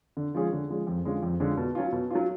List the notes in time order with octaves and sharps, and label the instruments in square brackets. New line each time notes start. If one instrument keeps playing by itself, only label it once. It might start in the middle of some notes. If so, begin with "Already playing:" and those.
[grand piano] D3
F3 G#3 C#4 G#4
D3
F3 G#3 C#4 G#4
F2
D3 G#3 C#4 F4
F2
D3 G#3 C#4 F4
B2
F#3 C#4 F4
B2
F#3 C#4 F4